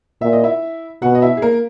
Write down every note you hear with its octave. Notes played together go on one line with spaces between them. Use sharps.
A#2 E5
D#5
E4 E5
B2 F#4 F#5
D#5
E4 E5
G#4
A#3 A#4